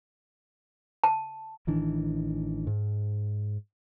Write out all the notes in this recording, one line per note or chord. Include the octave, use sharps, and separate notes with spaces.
A5
A1 D#3 E3 D4
G#2